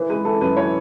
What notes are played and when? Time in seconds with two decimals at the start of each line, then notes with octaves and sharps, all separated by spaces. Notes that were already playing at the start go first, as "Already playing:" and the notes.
Already playing: E3
0.09 G#3 B4
0.25 E3 A4
0.41 F#2 B4
0.57 E3 C#5